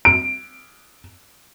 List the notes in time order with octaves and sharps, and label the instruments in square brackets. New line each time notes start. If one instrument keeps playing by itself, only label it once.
[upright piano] D7